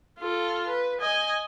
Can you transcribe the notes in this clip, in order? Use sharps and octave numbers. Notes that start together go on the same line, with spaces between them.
F4 A4
B4
D#5 G#5